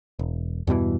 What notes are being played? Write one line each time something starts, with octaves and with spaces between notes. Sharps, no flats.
E1
E2 G2 B2 E3